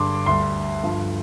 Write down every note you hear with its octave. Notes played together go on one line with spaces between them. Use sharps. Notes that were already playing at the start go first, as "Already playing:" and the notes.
Already playing: G2 D3 G3 C6 D6
D2 D3 G3 C6
G2 F3